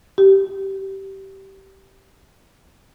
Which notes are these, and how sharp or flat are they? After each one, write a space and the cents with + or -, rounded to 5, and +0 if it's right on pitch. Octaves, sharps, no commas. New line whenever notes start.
G4 -20